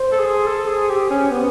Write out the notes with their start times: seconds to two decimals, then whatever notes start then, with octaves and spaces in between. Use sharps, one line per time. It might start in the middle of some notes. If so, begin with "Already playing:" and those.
Already playing: C5
0.12 A4
0.19 G#4
0.47 A4
0.68 G#4
0.89 G4
1.10 C#4
1.31 B3